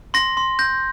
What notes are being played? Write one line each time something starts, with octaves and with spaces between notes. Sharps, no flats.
C6 A#6
C6
G6 A#6